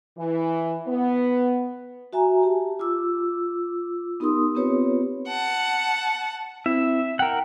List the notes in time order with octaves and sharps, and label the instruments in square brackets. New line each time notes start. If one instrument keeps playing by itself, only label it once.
[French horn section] E3
B3
[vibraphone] F#4 E5 G#5 A#5
G4 A5
F4 D6 E6
B3 D#4 G4 A#4 C6 D#6
B3 C4 F4 G4 B4 C#5
[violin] F#5 A5
[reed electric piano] C4 E4 [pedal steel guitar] E5
[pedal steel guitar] A#4 F#5 [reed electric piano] G5